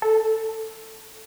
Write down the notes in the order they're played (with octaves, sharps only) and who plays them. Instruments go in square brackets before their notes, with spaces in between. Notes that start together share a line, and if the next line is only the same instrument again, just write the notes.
[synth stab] A4